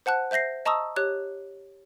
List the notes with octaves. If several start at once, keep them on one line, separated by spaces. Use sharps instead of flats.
C5 F#5 A5 F#6
C5 E5 G6 A#6 C7
D#5 A5 A#5 C#6 D#6 E6
G4 C#5 F#6